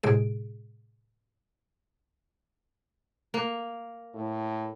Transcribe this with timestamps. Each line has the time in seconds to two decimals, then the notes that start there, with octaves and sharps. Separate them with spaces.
0.03 A2 C3 G#3 G#4 D7
3.34 A#3
4.14 A2